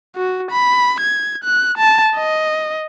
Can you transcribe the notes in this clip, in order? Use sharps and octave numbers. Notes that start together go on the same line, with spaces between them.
F#4
B5
G#6
F#6
A5
D#5